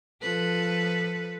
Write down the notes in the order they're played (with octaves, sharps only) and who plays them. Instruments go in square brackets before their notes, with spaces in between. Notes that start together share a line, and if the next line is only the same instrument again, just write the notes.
[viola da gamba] F3 A4 B4